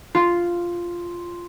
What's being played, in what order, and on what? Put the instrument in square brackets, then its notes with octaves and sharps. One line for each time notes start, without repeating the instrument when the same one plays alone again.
[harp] F4